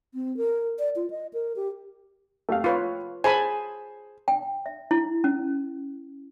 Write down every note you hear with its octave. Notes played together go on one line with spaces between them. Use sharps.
C4
A#4
D5
F4
D#5
A#4
G4
A3 G4 F5
F4 B4 C#5
G#4 C5 G#5 A5 B5
G5
E5
E4
C#4